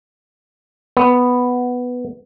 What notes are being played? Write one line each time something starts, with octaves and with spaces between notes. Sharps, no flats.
B3